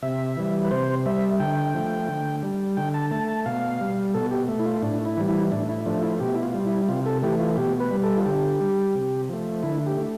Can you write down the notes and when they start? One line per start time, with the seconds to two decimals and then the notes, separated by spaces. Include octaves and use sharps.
0.02 C3 E5
0.37 E3 G3
0.65 B4
0.71 C3 C5
1.06 G3 E5
1.40 D3 G5
1.75 F3 A3
2.08 D3
2.43 G3
2.77 D3 G5
2.94 A5
3.11 A3 A5
3.28 A5
3.46 B2 F5
3.80 G3
4.14 B2 A4
4.31 G4
4.48 A3
4.59 E4
4.66 F4
4.82 A2 D4
5.05 E4
5.17 E3 G3
5.28 E4
5.52 A2 D4
5.69 E4
5.86 F3 A3 D4
6.03 E4
6.20 B2 G4
6.35 E4
6.43 F4
6.54 G3
6.66 E4
6.89 C3 F4
7.06 A4
7.22 E3 A3 G4
7.40 F4
7.57 B2 G4
7.80 B4
7.91 G3
8.04 A4
8.17 F4
8.25 D3 G4
8.60 G3
8.95 C3
9.29 F3 A3
9.63 D3 E4
9.86 G4
9.97 A3